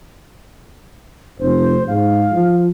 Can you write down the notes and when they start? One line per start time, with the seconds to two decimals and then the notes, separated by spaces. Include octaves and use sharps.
1.40 F1 C5
1.88 G#2 F5
2.32 F3